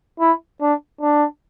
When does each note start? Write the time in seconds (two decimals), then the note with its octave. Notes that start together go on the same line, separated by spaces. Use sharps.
0.20 E4
0.61 D4
1.01 D4